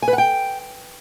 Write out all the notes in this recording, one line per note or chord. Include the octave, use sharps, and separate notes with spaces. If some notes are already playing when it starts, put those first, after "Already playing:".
G#5
B4
F#5
G5